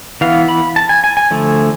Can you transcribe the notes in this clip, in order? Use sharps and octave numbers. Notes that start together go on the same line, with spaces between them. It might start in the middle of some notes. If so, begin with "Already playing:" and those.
E3 B3 F5
B5
A5
G#5
G#5
G#5
D3 F3 A3